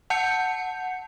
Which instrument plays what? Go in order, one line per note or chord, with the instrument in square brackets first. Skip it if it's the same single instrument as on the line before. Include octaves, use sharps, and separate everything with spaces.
[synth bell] F#5 A5 G6 C#7